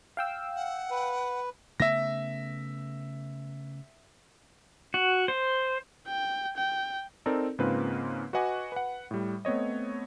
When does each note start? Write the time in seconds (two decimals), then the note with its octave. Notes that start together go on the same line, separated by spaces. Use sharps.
0.17 F5 G5 E6
0.56 F#5
0.91 B4
1.80 C#3 A3 B3 E5 A#6
4.94 F#4
5.28 C5
6.08 G5
6.57 G5
7.26 C4 D#4 A4 A#4 D5
7.59 G#2 C#3 A#3 C4 F4 B4
8.33 F#4 B4 D#5 F#5 G#5 D6
8.72 B4 F#5
9.11 A2 G3
9.45 A3 B3 C4 C#5 D#5